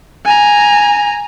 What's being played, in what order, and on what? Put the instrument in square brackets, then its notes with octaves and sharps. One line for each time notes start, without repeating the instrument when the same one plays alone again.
[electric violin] G#5 A#5